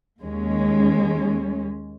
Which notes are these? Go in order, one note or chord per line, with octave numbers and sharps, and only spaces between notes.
D#2 G#3 C#4